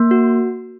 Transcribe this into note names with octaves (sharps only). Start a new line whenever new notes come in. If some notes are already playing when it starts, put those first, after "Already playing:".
Already playing: A#3
F#4